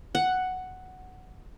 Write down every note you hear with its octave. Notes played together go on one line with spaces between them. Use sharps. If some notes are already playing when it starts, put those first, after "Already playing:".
F#5